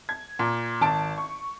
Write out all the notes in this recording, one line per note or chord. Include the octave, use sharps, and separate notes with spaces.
G#6
A#2
G#1 A5 D7
C#6